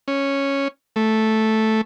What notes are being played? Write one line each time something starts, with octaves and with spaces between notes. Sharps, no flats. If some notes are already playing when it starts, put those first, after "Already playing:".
C#4
A3